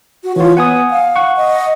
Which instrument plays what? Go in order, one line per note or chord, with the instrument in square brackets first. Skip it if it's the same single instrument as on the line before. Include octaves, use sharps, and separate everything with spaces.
[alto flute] F#4
[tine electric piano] E3 F4 [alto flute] C#5
[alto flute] B3 [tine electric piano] F#5 G#5 D#6
[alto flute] F5
[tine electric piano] F#5 C#6
[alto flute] D#5